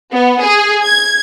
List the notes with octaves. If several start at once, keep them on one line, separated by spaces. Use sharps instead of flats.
B3
G#4
G#6